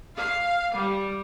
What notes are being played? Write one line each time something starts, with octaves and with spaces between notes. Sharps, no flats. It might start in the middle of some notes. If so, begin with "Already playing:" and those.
F5
G3